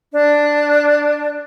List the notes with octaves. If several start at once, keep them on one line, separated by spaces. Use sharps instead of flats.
D4